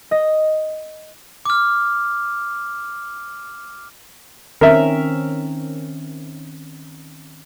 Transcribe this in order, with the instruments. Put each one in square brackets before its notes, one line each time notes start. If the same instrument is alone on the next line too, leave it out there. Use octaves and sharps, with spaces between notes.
[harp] D#5
[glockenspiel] D6 F6
[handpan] D#3 C4 C#4 [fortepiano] A#4 E5